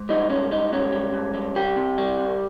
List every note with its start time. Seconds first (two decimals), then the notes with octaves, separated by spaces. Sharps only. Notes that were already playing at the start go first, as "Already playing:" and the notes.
Already playing: G#2
0.09 G3 D#4
0.30 G#2 C#4
0.51 G3 D#4
0.73 G#2 C#4
0.93 G3
1.14 G#2
1.34 G3
1.55 C2 G4
1.76 C3
1.98 G3
2.18 C2